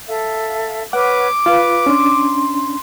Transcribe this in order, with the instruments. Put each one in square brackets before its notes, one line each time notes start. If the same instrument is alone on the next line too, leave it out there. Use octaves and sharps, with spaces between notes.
[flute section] A4 E5 F5
[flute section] B4 C#5 F6 [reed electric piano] F#5 [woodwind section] D6
[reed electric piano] F4 F5 [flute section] B4
[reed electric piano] C#4 D4 [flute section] C6